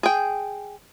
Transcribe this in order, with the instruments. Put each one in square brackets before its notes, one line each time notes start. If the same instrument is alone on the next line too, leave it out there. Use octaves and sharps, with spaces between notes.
[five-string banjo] G#4 G5